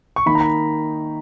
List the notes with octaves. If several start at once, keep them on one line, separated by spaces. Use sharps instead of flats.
C#6
D#3 A#3 D#4 B5
A#5
B5